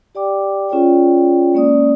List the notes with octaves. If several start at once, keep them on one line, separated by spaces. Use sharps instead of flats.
G4 D5 G5 D6
C#4 F4 G#4 C#5 D5 G5
G#3 A#3 C#4 D5 D#6